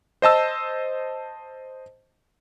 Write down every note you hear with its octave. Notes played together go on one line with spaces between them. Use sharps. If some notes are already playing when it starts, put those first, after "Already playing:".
C5 D#5 A5 E6